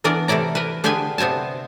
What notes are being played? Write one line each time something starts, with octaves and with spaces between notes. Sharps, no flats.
E3 B3 D4 A#4 D5
C3 A3 E4 D5 A#5
A#4 B4
D3 D4 G4 G#4 B4 G#5
C3 B3 C4 G#5 A5